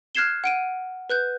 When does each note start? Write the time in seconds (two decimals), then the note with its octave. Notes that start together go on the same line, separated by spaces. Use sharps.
0.15 F6 F#6 G#6 C7 E7 G7
0.44 F#5 D7 D#7
1.10 B4 F#6 G6